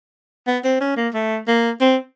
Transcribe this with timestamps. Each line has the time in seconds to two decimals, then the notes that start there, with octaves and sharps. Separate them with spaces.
0.47 B3
0.64 C4
0.81 C#4
0.97 A#3
1.14 A3
1.48 A#3
1.81 C4